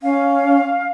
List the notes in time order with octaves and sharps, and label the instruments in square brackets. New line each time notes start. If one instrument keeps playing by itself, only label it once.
[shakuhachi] C#4 [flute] F5